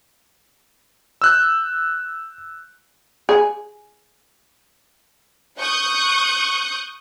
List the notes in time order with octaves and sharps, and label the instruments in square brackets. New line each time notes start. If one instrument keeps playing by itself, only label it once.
[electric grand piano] E6 F#6 G6
[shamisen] G#4
[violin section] C#6 D#6 F#6 G6